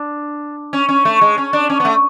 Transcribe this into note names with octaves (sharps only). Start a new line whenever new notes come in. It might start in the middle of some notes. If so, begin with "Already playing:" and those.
Already playing: D4
C#4
C#4
A3
G#3
C#4
D4
C#4
B3
A3